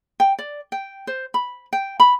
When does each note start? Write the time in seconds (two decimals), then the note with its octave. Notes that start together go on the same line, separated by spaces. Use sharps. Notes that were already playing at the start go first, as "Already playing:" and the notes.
0.20 G5
0.39 D5
0.72 G5
1.07 C5
1.34 B5
1.73 G5
2.00 B5